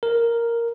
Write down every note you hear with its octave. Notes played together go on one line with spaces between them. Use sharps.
A#4